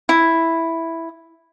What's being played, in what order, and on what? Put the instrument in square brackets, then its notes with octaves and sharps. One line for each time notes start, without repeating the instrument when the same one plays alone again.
[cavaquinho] E4